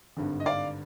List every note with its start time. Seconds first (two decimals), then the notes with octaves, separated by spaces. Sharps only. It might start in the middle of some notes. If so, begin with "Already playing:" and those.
0.17 G#1 G2 D3
0.40 D#5
0.46 D5 F5